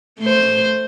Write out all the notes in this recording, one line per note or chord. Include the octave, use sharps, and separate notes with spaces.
A3 C5